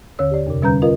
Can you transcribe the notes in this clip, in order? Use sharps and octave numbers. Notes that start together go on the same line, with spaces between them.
D#2 D3 C#5 E6
G4 D5
F2 C3
D3 G3 C#4 B4 A#5 G6
F4 A#4 B4 D#5 F5